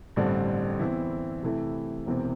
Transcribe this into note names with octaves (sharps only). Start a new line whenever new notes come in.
A1 G2 D3 G3 C4
E2 E3 C4 E4
C3 E3 A3 E4
E1 E2 C3 E3 C4